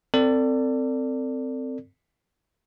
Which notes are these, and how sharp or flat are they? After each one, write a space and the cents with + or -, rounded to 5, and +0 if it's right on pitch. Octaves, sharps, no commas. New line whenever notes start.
C4 -10 A4 +35 D5 +0